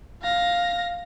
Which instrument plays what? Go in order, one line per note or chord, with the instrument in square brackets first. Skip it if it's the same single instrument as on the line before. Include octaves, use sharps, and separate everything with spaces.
[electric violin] F5 A#6